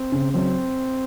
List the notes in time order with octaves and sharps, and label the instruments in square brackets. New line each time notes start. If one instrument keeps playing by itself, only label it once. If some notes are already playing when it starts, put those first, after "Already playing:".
Already playing: [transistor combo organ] C4
[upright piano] C#3
[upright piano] F#3 [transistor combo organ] C4